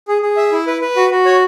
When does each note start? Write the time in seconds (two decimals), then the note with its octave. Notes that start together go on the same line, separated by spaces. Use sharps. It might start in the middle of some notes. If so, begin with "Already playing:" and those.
0.08 G#4
0.22 G#4
0.37 E5
0.52 E4
0.67 B4
0.82 B4
0.96 F#4
1.11 F#4
1.26 C#5